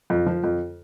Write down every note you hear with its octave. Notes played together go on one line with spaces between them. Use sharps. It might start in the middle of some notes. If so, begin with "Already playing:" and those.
F2
F3
F2